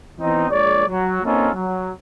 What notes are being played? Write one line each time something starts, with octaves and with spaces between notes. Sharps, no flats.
E3 B3 C4 D#4
A#1 G#3 C#5 D5
F#3
A#3 C4 C#4 D#4 F4 A4
F#3